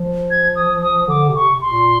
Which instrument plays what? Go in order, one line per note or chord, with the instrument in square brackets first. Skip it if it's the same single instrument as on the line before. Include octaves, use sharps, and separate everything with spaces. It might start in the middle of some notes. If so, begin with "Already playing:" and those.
Already playing: [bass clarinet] F3
[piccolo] G#6
D#6
D#6
[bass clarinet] D3 [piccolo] D6
[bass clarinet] C3
[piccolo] C#6
C6
[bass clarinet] A#2